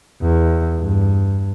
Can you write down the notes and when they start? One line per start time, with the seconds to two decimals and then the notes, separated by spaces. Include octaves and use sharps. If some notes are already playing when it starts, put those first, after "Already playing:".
0.22 E2
0.79 G2